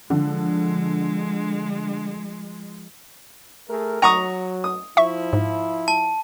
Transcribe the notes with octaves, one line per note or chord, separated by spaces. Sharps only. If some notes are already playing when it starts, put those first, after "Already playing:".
D3 F3 G#3
A3 G#4 A#4
F#3 F#5 A#5 C#6 D#6
D#6
F3 E4 E5 C#6
G#2
A5